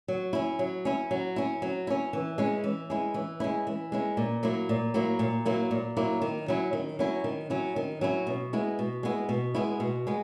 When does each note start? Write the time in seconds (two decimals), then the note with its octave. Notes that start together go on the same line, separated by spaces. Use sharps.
0.08 F#3
0.33 C#4 E4
0.59 F#3
0.85 C#4 E4
1.11 F#3
1.36 C#4 E4
1.62 F#3
1.87 C#4 E4
2.13 E3
2.38 G#3 C#4 E4
2.64 E3
2.90 G#3 C#4 E4
3.14 E3
3.40 G#3 C#4 E4
3.67 E3
3.92 G#3 C#4 E4
4.17 A#2
4.43 F#3 A#3 E4
4.69 A#2
4.94 F#3 A#3 E4
5.19 A#2
5.45 F#3 A#3 E4
5.71 A#2
5.97 F#3 A#3 E4
6.22 D#3
6.48 F#3 C#4 E4
6.73 D#3
6.99 F#3 C#4 E4
7.24 D#3
7.50 F#3 C#4 E4
7.76 D#3
8.01 F#3 C#4 E4
8.27 B2
8.53 G#3 B3 E4
8.79 B2
9.03 G#3 B3 E4
9.29 B2
9.55 G#3 B3 E4
9.80 B2
10.07 G#3 B3